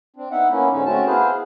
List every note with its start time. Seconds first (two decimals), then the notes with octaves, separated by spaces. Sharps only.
0.16 C4 D4
0.31 B3 D#4 E5 F#5
0.50 A#3 B3 C#4 E4
0.71 G#2 D3 G#3 C#4 D#4
0.86 A3 C4 C#4 F#4 A5
1.06 B3 E4 G#4 B4 C5 F5